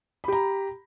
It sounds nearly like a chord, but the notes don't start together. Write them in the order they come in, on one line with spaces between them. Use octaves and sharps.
B5 G4 A#5